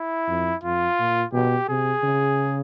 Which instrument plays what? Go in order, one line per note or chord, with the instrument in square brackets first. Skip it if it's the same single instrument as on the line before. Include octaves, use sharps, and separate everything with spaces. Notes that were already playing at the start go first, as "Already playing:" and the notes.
Already playing: [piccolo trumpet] E4
[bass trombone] F2
[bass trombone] F2 [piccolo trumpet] F4
[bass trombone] A#2
[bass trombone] B2 [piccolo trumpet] G4
[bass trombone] C3 [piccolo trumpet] G#4
[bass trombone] C#3